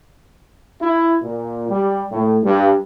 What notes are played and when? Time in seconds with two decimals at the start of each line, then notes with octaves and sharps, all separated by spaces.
0.81 E4
1.22 A#2
1.69 G3
2.12 A2
2.43 G2